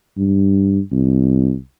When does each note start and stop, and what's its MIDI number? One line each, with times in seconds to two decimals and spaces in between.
0.17 0.80 43
0.92 1.55 36